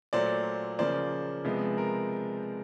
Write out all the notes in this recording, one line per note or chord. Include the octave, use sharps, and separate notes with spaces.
A#2 F#3 A3 C5 D5
C#3 F3 A#3 C5 D5
C3 F3 G#3 B3
A#4